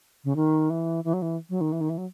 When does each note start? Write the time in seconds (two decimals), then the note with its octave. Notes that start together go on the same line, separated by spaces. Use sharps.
0.24 C#3
0.36 D#3
0.70 E3
1.04 E3
1.13 F#3
1.22 E3
1.50 F#3
1.61 D#3
1.72 E3
1.81 D#3
1.89 E3
1.98 F#3